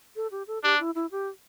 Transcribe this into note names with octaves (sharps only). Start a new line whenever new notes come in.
A4
G4
A4
D4 G4
E4
E4
G4